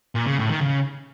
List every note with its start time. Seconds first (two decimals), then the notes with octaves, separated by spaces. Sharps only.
0.15 A#2
0.26 C#3
0.38 A2
0.50 D#3
0.61 C#3